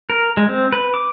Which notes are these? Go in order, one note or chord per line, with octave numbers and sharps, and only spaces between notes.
A#4
G#3
C4
B4
D6